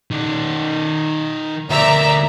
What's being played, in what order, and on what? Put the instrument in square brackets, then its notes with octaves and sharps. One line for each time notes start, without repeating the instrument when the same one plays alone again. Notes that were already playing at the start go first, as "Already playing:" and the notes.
[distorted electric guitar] D#3 D5
[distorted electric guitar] D2 A#4 [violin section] D5 E5 A#5